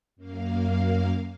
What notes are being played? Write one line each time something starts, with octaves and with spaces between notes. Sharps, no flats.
F#2 A#3 F5